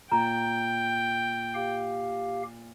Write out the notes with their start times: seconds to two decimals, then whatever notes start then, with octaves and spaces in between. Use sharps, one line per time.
0.12 A#2 G5 A#5
1.55 G4 F5